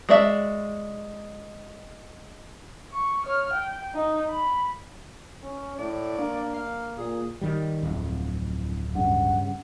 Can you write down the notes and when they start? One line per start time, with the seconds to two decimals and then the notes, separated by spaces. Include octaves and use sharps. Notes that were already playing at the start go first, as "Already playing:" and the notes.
0.09 G#3 F#4 D5 E5
2.92 C#6
3.25 C#5 F6
3.54 G5
3.94 D#4
4.30 B5
5.43 C#4
5.78 A2 D5
6.18 A#3 D4
6.53 F5
6.98 A#2 G#4
7.41 D#3 G3
7.83 D1 F2
8.95 G2 C#3 F#5